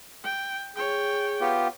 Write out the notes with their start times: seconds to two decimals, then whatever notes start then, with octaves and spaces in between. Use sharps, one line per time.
0.24 G5
0.76 G#4 C#5 G5
1.41 B3 F4 G4